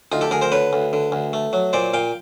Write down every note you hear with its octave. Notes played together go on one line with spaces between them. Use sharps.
D2 D#4 F4
G4 A4
D2 G#4 A#4
A#4 C5
D3 B4 C#5
D2
D3
D2
A3
F#3
A#2 C5 D5
A#2 F5 G5